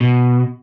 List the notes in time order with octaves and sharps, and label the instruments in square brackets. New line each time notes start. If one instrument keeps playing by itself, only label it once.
[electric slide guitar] B2